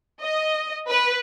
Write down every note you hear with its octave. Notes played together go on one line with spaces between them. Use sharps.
D#5
B4